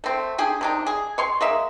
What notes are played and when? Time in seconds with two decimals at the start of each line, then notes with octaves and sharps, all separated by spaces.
0.04 A3 C4
0.38 D4 G4 G#4
0.61 C3 D4 D#4
0.87 G#4
1.18 C#5 C6 C#6
1.41 G#3 A#3 E5